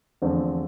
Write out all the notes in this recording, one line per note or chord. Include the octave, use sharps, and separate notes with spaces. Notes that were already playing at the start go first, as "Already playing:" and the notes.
E2 D3 F3 A3 C4